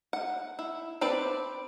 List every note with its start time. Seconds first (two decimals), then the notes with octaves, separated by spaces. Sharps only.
0.13 F#5
0.59 E4
1.01 C4 B4 D5